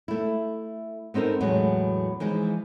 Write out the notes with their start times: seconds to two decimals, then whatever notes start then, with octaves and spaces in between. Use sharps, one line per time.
0.08 A3 E4
1.14 B3 C4 D#4 A4 A#4
1.40 E2 A2 F#3 G#3 B3
2.20 E3 F3 G#3 D#4